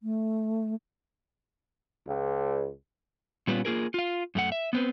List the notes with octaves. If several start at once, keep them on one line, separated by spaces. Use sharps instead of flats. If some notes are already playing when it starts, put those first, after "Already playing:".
A3
C#2
A#2 G3 B3 C#4 F4
A#3 F4 G#4 A#4
F4 F5
F#2 A3 F#5
E5
B3 C4 B4